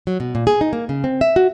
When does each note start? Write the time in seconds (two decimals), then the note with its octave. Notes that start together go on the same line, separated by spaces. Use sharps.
0.07 F#3
0.20 B2
0.35 A#2
0.47 G#4
0.61 D#4
0.73 A#3
0.89 C#3
1.04 C4
1.21 E5
1.36 F#4